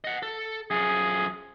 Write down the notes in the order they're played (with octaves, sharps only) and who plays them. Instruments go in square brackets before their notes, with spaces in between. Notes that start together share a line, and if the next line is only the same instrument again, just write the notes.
[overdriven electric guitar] D#5 F#5
A4
[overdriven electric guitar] F#2 F3 [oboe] G#4